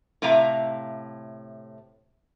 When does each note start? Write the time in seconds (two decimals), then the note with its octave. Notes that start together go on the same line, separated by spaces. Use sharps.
0.22 A2 C3 E5 F5 A#5